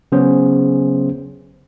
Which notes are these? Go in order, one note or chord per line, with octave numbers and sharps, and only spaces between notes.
C#3 F#3 B3 C#4 G#4 C5